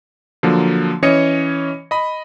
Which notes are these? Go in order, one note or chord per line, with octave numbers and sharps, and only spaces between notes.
D3 F3 F#3 A#3
E3 C#4 C#5 D#5 C#7
D#5 B5